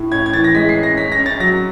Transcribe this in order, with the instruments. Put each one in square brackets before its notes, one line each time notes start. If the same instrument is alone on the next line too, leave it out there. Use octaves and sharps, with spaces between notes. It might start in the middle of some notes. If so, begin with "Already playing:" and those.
Already playing: [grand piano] A2
C#4 G#6
G#6
E3 A6
A#6
G#3 B6
C7
C#4
A#6
C#4 B6
A#6
C#4
A6
F#3 A#6